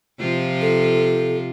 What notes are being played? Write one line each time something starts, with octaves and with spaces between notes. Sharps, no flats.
C3 F3 F4
A4